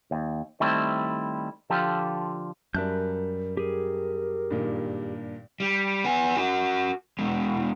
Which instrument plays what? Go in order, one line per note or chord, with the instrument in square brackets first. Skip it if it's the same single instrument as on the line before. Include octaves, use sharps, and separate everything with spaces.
[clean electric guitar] D#2
D#3 G3 A3 C4 E4
D3 F3 F4 G4 A4
[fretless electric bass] F#2 [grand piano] G3 E5 A5 [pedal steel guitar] A#4 F#6 G6
[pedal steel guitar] G4 G#4 [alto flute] A#4
[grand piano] G2 A#2 D#3
[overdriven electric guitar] G3
B3 G#5
F#4 A#4
E2 G#3